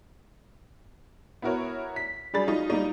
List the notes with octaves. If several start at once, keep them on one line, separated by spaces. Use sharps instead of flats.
B3 E4 F#4 A#4 C#5
B6
F#3 G3 D4 G#4 B5 A6
F#3 D#4 F4
G3 A#3 D#4